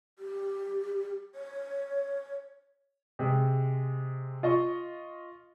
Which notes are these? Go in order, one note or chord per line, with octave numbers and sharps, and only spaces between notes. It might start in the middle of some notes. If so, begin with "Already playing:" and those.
G4
C#5
C3 G#3
F4 D#5 C#6